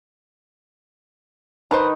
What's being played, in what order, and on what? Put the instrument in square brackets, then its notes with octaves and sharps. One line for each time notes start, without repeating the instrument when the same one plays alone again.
[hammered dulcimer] D#3 D#4 [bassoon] B4 [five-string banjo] C5 A5 A#5